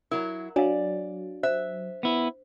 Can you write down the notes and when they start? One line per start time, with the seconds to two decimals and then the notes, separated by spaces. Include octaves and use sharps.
0.11 F#3 E4 A#4
0.56 F#3 D4 D5 F5
1.43 C5 E5
2.03 B3 E4